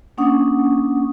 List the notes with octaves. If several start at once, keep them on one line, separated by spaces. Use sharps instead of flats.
A#3 C#4 D4 F#5 C#6 D#6